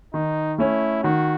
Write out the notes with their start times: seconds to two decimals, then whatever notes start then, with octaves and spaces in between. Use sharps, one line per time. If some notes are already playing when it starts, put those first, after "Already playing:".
0.14 D#3 D#4
0.58 A3 C#4 E4
1.04 D#3 F#4